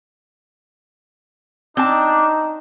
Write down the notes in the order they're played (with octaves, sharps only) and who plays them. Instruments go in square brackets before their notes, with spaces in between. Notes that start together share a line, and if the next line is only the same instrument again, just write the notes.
[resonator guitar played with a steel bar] C4 A5 [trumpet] D4 [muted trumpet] D#4